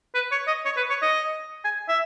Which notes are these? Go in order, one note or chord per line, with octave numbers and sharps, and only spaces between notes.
B4
C#5
D#5
C#5
B4
C#5
D#5
G#5
E5